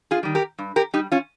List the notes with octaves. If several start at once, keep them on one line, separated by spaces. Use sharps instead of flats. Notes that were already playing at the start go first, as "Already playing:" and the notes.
F4 G#4
D#3 G3
G4 A#4
G2
G4 A#4
G3 D#4 G4
C#4 F4